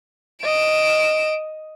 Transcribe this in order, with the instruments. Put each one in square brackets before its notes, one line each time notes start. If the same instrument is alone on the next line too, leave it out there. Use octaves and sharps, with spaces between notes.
[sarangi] D#5 [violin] D7 E7